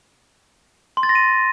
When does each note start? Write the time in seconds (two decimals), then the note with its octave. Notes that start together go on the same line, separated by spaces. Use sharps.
0.97 C6
1.03 A6
1.09 A#6
1.15 D#7